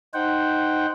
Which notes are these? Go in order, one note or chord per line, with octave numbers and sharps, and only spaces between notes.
D#4 C5 F#5 G5